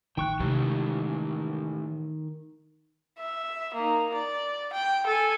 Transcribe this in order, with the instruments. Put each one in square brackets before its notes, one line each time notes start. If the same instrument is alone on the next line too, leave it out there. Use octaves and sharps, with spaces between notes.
[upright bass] A1 [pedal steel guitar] D#3 C#6 F#6 [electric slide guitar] G5
[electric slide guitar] A2 E3 G4 [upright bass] C3 G#3
[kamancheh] E5
A#3 D#4
D5
G5
A4 G#5